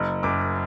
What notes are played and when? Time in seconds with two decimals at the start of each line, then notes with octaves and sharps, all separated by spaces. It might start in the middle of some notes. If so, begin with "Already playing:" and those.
Already playing: F#1
0.23 F#2 D6